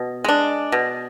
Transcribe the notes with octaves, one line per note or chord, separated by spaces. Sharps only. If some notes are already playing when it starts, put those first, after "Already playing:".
Already playing: B2
G#3 D4
B2